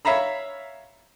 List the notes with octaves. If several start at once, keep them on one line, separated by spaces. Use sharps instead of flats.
C#5 E5 F5 A#5 B5